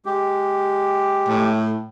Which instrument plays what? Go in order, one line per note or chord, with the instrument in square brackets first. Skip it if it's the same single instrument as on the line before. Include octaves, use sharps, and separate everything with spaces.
[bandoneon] G#3 G4
[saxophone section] A2